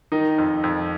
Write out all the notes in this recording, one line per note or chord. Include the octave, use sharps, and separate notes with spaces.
D#3 D#4
F2
F2